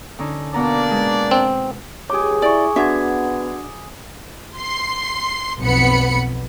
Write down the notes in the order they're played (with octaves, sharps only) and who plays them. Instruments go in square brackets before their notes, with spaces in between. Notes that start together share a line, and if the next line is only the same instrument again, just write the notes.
[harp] D3 C#4 D#4
[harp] B2 B3 A#5 [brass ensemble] A#3 D4 D5
[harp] G#3 B4
[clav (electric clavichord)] C4
[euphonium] C#2 [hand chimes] G4 C#5 [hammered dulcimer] G#4 D6
[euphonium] E4 [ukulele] D5 [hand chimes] G#5 C#6
[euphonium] B3 [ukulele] D4 E5 [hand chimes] F#4 F#5 G#6
[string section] C6 C7
B1 F2 B3 B5 C#7